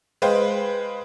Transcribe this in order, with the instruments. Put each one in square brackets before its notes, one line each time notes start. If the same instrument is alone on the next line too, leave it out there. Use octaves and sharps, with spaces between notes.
[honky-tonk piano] G#3 B4 C5 F5 G5